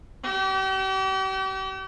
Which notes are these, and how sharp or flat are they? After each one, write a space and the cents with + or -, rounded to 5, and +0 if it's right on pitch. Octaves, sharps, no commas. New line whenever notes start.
G4 -40